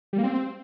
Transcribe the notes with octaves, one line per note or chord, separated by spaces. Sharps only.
G3
A#3
C4